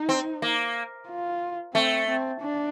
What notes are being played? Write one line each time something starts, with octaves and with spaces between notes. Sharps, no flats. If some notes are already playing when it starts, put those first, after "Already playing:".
Already playing: D#4
C4
A#3
F4
A3 C4
C4
D4